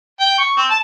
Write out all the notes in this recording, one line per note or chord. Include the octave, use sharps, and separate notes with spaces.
G5
C#6
C4
A5